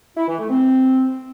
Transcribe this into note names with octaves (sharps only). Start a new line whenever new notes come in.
E4
E3
A3
C4